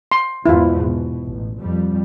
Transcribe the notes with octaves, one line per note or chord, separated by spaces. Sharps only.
C6
E2 G#2 B2 E4 F4
B2
A1
F2 G3